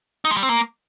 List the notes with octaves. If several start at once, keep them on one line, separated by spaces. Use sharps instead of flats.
D#4
G#3
G3
C4
A#3